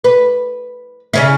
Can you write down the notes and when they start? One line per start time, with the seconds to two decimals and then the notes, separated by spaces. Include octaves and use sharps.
0.04 B4
1.13 C#3 C#4 E4